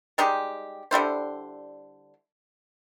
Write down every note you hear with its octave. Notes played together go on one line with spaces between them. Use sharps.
G3 G#3 D#4 G4
D3 G3 E4 C5